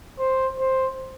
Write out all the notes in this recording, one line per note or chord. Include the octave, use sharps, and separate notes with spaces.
C5
C5